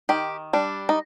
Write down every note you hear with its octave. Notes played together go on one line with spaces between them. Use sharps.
D#3 G4
G3 D4
D#4